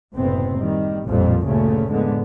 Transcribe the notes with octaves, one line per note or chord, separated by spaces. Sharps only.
F#1 A2 C3 B3 C4
D#3 G3
A1 F2 A#2 F3 G3
G1 D2 A#2 C#3 A3 C#4
F1 A2 D3 G#3 B3